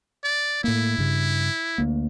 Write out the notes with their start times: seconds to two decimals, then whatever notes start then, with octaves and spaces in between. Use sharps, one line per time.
0.24 D5
0.64 A2 A#3 E4
0.98 G2 C#3
1.78 D2 A#3